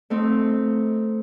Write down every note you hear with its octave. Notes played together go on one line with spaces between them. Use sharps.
A3 C4 D#4